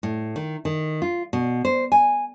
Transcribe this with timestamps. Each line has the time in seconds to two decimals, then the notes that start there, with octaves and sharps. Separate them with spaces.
0.03 A2
0.36 D#3
0.65 D#3
1.02 F4
1.33 B2
1.65 C5
1.92 G#5